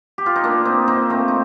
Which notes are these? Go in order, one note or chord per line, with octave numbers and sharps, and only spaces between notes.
G4
F4
D#4
A#3 D4
C4 D#4
C4 D#4
A3 C4
D#4